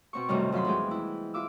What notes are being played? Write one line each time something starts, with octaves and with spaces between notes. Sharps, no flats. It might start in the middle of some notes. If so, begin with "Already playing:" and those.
B2 C4 C#6
F#2 A2 C3 D#3 G3
F#2 F#3 F4 B5 C6
F2 E3 G#3 B3 G#4 G5
E4
F4 E5 D6 E6